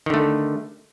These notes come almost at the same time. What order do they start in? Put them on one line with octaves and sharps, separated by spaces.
D#3 D3 A3